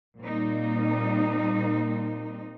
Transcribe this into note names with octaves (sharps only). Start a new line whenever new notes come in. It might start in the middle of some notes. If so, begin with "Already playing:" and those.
A#2 G3 A#3 C4 D#4